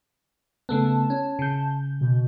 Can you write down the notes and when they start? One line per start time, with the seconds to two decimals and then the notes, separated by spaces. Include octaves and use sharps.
0.69 C#3 A3 B3 A5
1.10 C#4
1.39 C#3 G6
2.01 B2